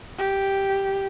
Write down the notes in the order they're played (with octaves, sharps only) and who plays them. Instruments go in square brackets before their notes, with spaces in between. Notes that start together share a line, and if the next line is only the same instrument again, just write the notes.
[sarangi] G4